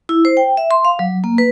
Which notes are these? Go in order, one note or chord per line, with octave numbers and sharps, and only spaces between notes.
E4
C5
G5
E5
C6
F5
F#3
A#3
B4